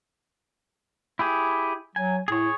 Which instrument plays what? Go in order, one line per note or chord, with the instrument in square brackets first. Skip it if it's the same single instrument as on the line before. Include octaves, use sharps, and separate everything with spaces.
[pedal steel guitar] E4 G4 G#4
[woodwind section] F#3 [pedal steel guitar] G#5
[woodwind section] A2 [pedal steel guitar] G#4 C#5